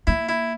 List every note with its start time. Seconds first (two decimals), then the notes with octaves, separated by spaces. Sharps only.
0.07 A#3 E4
0.29 E4